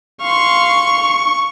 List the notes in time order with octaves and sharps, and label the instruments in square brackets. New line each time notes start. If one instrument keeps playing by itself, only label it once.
[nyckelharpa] F5 C6 [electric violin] C#6